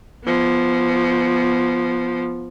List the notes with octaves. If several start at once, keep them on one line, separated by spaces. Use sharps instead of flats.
F3 B3